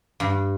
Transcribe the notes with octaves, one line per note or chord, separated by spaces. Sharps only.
G2